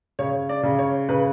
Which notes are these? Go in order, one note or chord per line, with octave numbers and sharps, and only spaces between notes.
C#3 C#5
D5
C#3
C#5
C#3 B4